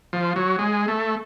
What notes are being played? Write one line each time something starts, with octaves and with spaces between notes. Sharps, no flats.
F3
F#3
G#3
A3